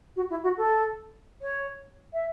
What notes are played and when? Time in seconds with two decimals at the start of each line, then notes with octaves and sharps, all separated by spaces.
0.16 F#4
0.30 E4
0.43 F#4
0.57 A4
1.41 C#5
2.13 E5